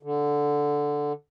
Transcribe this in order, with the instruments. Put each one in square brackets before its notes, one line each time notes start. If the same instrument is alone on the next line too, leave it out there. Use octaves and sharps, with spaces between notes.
[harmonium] D3